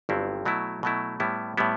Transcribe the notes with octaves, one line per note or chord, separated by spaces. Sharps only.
G1 G2 F#3 C4 E4
B2 F#3 A3 E4
B2 F#3 A3 E4
A2 G3 B3 E4
A2 G3 B3 E4